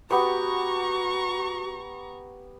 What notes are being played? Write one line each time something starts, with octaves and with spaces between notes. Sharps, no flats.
B3 F#4 G4 C#5 A#5 C#6